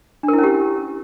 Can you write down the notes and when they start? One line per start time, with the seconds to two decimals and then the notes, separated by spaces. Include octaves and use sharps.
0.23 D4
0.28 A#4
0.33 E4
0.38 C#4
0.44 G4